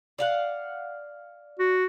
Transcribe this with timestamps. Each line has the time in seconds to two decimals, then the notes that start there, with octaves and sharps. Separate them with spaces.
0.18 D5 F5 F#5
1.59 F#4